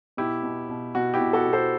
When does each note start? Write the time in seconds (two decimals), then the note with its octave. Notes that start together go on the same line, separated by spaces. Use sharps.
0.17 B2 E4 G4
0.43 B2
0.69 B2
0.95 B2 F#4
1.14 E4 G4
1.20 B2
1.33 F#4 A4
1.46 B2
1.53 A4 C5